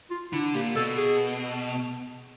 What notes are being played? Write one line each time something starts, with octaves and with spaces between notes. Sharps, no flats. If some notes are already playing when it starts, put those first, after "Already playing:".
F4
D3 E4
A#2 G4
B2 A4
G#4